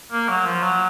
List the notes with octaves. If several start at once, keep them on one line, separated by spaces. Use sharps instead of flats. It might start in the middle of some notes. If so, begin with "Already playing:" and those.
A#3
F#3
F3
F#3